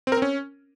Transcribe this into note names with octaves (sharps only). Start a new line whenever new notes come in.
C4
A#4
C4
C#4